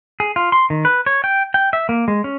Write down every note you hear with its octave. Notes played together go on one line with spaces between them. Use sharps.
G#4
F4
C6
D#3
B4
C#5
G5
G5
E5
A#3
G#3
C#4